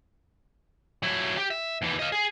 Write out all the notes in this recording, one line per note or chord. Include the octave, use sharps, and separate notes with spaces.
F#3 E4
G4
E5
D#2 E3
D#5 F5
G#4